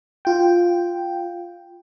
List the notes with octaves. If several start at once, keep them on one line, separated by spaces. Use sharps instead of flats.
F4 G5